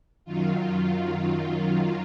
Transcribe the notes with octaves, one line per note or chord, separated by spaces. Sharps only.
F#2 D#3 F#3 F4